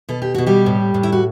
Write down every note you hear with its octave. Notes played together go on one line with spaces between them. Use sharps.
B2 A4
G4
B2 F#4
G3 G4
A2
A2
E4
F#4